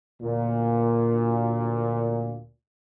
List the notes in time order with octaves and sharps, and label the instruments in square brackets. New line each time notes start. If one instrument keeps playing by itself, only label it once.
[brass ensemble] D2 A#2